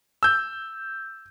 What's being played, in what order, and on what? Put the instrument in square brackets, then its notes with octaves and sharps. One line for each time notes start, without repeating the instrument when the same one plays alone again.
[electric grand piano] E6 G6